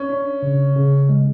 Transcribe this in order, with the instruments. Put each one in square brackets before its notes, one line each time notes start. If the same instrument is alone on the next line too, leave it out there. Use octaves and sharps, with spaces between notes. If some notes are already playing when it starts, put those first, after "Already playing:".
Already playing: [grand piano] C#4
[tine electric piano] D4
C#3
C#3
G#3